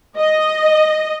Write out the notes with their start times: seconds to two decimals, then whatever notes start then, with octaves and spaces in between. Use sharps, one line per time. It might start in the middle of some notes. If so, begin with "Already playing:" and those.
0.17 D#5